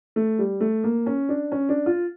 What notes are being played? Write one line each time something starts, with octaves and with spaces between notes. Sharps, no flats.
A3
G3
A3
A#3
C#4
D4
C#4
D4
F4